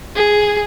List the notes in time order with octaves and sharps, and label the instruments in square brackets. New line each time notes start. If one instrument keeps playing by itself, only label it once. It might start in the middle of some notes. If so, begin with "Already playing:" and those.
[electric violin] G#4